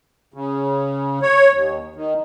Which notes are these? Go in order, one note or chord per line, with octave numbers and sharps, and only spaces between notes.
C#3
C#5
D#2
D#3